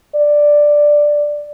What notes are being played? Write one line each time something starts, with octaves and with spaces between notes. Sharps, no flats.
D5